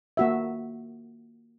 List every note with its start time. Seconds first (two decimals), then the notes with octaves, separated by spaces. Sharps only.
0.17 A#3 F#4 E5